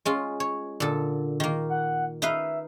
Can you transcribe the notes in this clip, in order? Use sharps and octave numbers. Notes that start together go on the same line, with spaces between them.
G#3 C#4 F4
C#5
A#2 D3 A4
D#3 A#3
F#5
D#4 B4 E5 F5